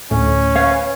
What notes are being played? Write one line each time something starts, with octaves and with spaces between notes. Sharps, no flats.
D2 A2 C#4
B4 C#5 F5